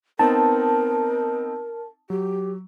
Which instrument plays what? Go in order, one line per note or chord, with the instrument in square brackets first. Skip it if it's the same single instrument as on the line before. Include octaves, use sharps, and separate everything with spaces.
[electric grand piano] B3 C4 D#4 [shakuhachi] A#4 [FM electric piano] A5
[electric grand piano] F#3 [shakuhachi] G4